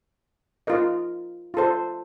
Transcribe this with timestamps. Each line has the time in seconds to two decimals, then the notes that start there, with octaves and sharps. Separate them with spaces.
0.67 F4 A#4 D#5
1.54 F4 A4 C5